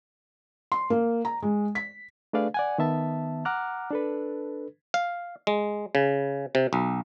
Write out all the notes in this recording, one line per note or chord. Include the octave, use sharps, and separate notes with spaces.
C6
A#3
A#5
G#3
B6
A3 D4 G#4 B4 D5 F5
D5 F#5 G#5
D#3 B3 E5 A5
F#5 A#5 D6 F6 F#6
D4 A4 B4
F5
G#3
C#3
C3
B1